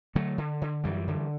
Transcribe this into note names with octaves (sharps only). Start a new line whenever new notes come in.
D3 F#3 A3
D3
D3
F#2 E3 G3
D3